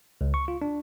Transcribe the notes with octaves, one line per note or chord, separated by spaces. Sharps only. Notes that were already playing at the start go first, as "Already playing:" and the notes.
C#2
C#6
F4
D4